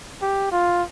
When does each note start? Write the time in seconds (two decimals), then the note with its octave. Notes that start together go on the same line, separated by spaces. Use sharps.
0.22 G4
0.52 F4